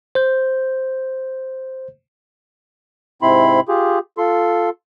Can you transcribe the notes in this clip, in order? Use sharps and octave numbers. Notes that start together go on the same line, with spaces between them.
C5 G6
G#2 C3 C4 E4 B5 C6
F4 G4 G#4
F4 A4 C6